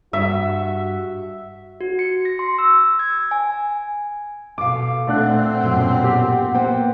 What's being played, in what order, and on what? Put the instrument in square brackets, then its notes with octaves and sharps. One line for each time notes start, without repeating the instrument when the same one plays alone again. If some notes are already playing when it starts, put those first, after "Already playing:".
[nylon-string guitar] G2 [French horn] F#4 [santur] E5
[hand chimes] F#4
C#7
A#6
C6
E6
G#6
G#5
[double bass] B2 [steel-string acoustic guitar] A4 F5 [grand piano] D6
[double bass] A#2 C4 [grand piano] A3 D4 F#6 [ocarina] F#5
[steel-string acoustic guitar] F#2 B2 G5
[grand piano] G4
[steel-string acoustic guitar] A#3 B3 C5 [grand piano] G5